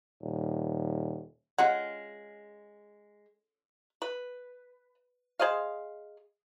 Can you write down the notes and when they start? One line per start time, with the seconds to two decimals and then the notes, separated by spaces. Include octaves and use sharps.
0.21 D#1
1.58 G#3 C#4 F4 F#5
4.02 B4
5.39 G#4 C5 D#5 F5